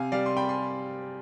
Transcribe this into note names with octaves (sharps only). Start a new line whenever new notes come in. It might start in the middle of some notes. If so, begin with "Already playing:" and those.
Already playing: C3 F5 G#5
G3 D5 F5
C6
C3 G5 B5
G#5 C6